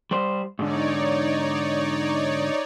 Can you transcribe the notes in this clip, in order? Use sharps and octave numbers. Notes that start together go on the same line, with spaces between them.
G3 C5
G#2 D3 D#4 C#5 D5